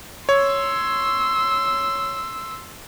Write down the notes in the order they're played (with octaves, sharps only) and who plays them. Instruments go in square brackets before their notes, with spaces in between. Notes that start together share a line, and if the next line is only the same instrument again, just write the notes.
[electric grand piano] C#5 [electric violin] C6 E6